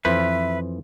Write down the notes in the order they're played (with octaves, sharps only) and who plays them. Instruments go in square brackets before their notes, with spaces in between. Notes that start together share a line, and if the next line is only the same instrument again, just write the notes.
[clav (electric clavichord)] F2 E3 C5 [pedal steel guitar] B4 [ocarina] E5